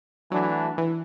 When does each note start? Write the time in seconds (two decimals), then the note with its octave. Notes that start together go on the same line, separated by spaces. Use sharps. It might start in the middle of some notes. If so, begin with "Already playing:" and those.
0.31 E3 F#3 A3 D4 F#4
0.78 E3